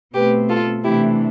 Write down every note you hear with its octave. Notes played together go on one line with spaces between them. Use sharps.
B2 A3 C4 G4 B4
F4 A4
C3 E3 A3 D4 E4 G4